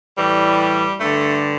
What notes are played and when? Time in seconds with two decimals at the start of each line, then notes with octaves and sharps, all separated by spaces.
0.18 A2 E3 G3
1.00 G2 D3 A3